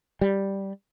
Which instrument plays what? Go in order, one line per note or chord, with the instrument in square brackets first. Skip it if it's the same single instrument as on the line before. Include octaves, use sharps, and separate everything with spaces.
[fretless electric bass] G3